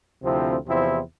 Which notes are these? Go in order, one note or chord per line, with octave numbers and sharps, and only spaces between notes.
D2 C3 F3 C4 E4
E2 C3 F3 C4 E4